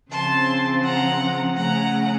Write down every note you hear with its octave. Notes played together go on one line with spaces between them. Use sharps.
C#3 F3 C4 A5 C6
F#5 A#5
C#3 A3 C#4 F#5 A#5